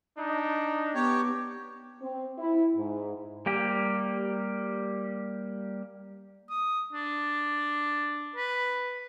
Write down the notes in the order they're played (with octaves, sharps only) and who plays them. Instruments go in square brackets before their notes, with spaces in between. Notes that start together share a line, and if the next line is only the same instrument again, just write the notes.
[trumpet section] D4 D#4
[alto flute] B3 [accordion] G4 C#5
[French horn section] C4
E4
G#2
[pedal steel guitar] G3 A#3 G4
[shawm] D#6
D4
B4